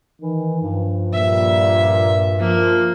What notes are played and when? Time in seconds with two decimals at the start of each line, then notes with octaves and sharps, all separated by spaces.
0.21 D#3 E3
0.62 G2 F3
1.13 A#2 G3 E5
2.40 F3 A#3 F4